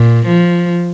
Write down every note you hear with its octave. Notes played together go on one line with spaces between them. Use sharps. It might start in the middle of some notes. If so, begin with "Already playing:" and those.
Already playing: A#2
F3